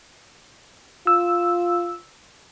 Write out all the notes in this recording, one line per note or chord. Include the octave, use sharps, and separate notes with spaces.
F4 E6